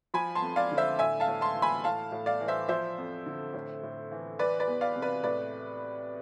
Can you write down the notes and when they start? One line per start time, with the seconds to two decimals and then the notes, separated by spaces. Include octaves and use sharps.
0.14 F3 G#5 B5
0.35 A5 C6
0.42 F2
0.56 D5 F5
0.71 D3
0.77 C5 E5
0.99 A2 E5 G#5
1.20 F5 A5
1.28 A2
1.41 A5 C6
1.55 E3
1.62 G#5 B5
1.84 A2 F5 A5
2.12 A2
2.26 D5 F5
2.41 E3
2.48 C5 E5
2.69 F3 C5 E5
2.98 F2
3.26 D3
3.54 A2
3.83 A2
4.11 E3
4.39 E3 B4 D5
4.60 B4 D5
4.68 E2
4.81 D5 F5
4.96 C3
5.02 B4 D5
5.24 A2 B4 D5